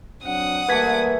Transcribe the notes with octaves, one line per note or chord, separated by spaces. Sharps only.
F#3 C4 D4 F#5 D#6
E3 G3 A3 A#3 B4 G#6 B6